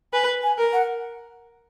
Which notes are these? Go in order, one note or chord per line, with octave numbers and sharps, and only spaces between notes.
B4 G#5
G#5
A#4
F#5